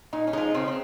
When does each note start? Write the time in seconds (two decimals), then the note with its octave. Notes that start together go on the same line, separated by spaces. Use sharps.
0.13 A#2 D#4
0.27 C#4
0.33 F3 G#3 D#4
0.54 C#3 C4
0.68 C4